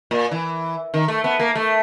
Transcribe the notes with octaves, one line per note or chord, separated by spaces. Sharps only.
A#2
E3
D#3
A3
B3
A#3
A3